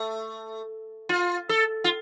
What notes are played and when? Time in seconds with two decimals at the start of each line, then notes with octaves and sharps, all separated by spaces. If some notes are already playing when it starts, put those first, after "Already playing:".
Already playing: A3
1.09 F4
1.49 A4
1.84 F4